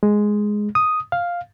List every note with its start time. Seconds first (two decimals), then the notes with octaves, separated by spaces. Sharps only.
0.03 G#3
0.75 D#6
1.12 F5